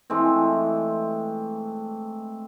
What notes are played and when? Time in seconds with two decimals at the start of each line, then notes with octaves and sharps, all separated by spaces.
0.10 E3 G#3 A3 C4